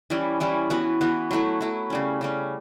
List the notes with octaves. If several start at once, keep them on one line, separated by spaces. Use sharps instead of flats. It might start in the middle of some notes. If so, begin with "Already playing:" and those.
E3 G3 C#4 E4
E3 G3 C#4 E4
E3 B3 F#4 B4
E3 B3 F#4 B4
F#3 A3 E4
F#3 A3 E4
C#3 G3 C#4
C#3 G3 C#4